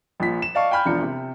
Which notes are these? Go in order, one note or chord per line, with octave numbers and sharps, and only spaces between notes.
A#1 F3 B6
E7
D5 D#5 F5 A5 C#6
G5 G#5 B5 F6 G6
E1 F3 D4 A#5 C#7
C3